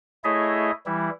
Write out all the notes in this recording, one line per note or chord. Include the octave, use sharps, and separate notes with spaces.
A3 E4 G#4 C#5 D#5 E5
E3 G3 E4